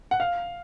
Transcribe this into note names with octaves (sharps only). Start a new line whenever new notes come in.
F#5
F5